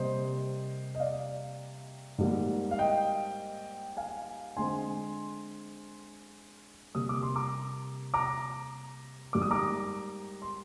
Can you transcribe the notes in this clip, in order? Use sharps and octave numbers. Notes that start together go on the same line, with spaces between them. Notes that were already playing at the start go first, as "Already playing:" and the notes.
Already playing: C3 G3 A#3 C5 D#5
D#5
D5 F5
G#2 G3 A#3
F5
D#5 G5
F5 G#5
D3 G#3 C4 G#5 C6
C3 G3 A#3 D#6
D6
C6
A#5 D6
A#5 D6
G#2 G3 A#3 D6
D#6
A#5 D6
C6